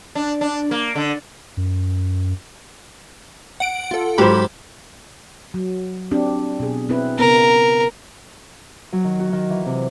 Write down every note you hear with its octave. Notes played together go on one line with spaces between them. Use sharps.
D4
D4
A#3
D3
F#2
F#5 D7
F4 A4
G#2 F#3 G4 C5 B5
F#3
C4 D4 G4
B2 G#4
C4 E4 B4
C#3 B3 A#4
F#3
D#3
F#4
D#3
E3
C3